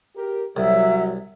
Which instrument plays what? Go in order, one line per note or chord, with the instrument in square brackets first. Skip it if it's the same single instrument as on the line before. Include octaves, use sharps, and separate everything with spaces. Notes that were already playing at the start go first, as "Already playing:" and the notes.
[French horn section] G4 A#4
[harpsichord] C2 [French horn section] F#3 [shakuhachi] E5